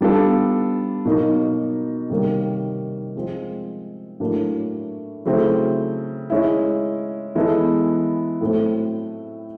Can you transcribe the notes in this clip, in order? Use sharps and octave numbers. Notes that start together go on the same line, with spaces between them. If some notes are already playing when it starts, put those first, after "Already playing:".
G3 B3 D4 F4 A4
B2 F#3 A#3 D#4
C3 D#3 G3 A#3 C#4
F3 G#3 C4 F4
A2 F#3 A#3 D4
C#3 F#3 A3 C4 E4
G#3 C#4 E4
E3 G#3 B3 E4 A4
A2 F#3 A3 C4